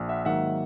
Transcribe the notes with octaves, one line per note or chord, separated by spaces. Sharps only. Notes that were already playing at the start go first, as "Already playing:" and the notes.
Already playing: A#1
E5 F#5
G#2 D#3 F#3 A#3 E5 F#5